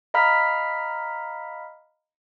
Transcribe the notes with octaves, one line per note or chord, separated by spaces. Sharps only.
D#5 F5 A#5 B5 F6 B6